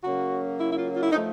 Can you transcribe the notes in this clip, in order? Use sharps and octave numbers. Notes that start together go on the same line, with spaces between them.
C#3 F#3 A#3 C#4 F#4
E4
E4
F4
F4
E4
D#4
F3 A3